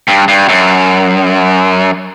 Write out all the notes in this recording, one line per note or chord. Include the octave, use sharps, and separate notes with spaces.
G2
G2
F#2